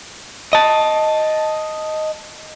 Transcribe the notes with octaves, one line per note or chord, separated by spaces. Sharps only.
D#5 A5